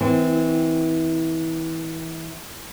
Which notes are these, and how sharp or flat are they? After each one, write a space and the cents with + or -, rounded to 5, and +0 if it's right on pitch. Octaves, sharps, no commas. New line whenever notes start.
E3 -25 C4 -35